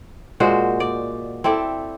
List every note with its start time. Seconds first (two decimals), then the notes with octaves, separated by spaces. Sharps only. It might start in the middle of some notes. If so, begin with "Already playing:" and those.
0.40 A#2 G#3 F#4 C5
0.80 D5
1.44 C4 E4 A4 D5